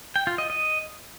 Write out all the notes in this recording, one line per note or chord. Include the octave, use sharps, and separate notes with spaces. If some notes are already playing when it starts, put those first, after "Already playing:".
G5
F4
D#5
D#5